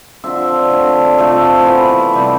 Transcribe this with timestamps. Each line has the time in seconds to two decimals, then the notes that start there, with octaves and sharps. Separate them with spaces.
0.24 D3 F3 C4 E5
0.71 D3 A3 C4
1.18 C3 F3 A3 C4 E5
1.66 E3 B3
2.13 C3 G3 C4